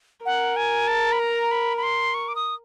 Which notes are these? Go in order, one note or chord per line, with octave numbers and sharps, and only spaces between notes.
A#4 F#5
G#5
A5
B5
A#5
B5
B5
C6
C#6
D6
D#6